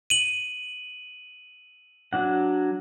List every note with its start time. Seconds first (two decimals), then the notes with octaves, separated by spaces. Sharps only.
0.10 D#7 F#7
2.13 F#3 D4 F#5